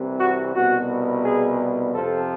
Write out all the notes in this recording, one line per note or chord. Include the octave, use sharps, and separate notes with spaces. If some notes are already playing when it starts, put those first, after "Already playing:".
Already playing: C2 C3 E3
F#4
C2 B2 F#4
G#4
F2 C3 F3 A4